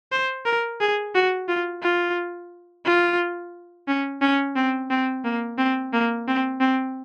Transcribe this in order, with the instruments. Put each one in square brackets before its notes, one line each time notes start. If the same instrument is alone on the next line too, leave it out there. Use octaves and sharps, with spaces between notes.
[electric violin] C5
A#4
G#4
F#4
F4
F4
F4
C#4
C#4
C4
C4
A#3
C4
A#3
C4
C4